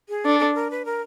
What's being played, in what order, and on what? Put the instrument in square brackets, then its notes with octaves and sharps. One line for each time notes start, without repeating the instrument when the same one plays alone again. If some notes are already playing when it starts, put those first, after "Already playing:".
[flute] G#4
[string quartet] D4 [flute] A4
[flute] A4
A#4
B4
A#4